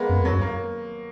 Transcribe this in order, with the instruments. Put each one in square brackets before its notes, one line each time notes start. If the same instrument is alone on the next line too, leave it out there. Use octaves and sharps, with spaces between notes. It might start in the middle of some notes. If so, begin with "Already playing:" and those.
Already playing: [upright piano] G#3 A#3 B3
[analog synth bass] F#2
[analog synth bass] F2 [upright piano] F#3
[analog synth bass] F#2
[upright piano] A#3